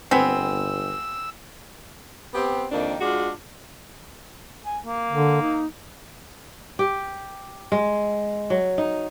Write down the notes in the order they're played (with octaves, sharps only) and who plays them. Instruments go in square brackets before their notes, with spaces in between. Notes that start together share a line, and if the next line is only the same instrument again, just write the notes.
[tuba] G1 [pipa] B3 G#4 [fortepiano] C4 [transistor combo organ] E6
[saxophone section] B3 C4 G4
F2 D#3 A#3 D4
G#3 D4 F4 F#4
[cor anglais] G#5
A#3
[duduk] D3
D#4
[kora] G4
G#3
F#3
D#4